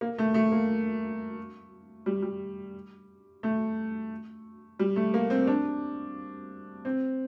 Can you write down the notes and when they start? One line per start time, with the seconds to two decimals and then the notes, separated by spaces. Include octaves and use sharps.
0.01 A#3
0.18 A3
0.34 A3
0.52 A#3
2.06 G3
2.22 G3
3.43 A3
4.79 G3
4.96 A3
5.14 A#3
5.30 C4
5.47 D4
6.85 C4